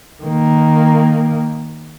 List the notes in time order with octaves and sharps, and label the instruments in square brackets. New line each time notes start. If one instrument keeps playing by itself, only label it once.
[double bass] D#3 A#3